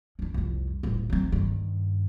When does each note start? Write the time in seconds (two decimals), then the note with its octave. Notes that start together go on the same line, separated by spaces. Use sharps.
0.19 C#4 D4
0.34 C2 F2
0.83 D#1 A1
1.10 F#3 C4
1.32 G2 D#3